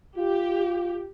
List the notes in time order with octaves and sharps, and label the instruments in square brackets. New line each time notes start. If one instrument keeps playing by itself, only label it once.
[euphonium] F4 [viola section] G4